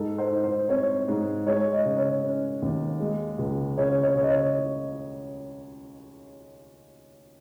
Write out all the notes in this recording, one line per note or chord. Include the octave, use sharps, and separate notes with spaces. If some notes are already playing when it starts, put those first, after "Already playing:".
Already playing: G#2 A4
C5
D#4
C5
C4 C#5
G#2
G#3 C#5
D#5
C#3
C#5
C#4
D#2
G#3
C#2
C#3 C#5
C#5
C#3
D#5
C#5